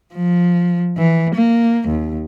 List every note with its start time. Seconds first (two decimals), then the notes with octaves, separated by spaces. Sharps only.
0.14 F3
0.98 E3
1.35 A#3
1.89 D#2